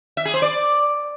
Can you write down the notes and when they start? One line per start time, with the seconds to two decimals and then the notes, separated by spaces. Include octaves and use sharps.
0.17 E5
0.25 G#4
0.34 C5
0.42 D5